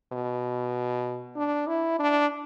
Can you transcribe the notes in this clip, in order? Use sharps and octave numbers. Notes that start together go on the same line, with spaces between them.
B2
D4
E4
D4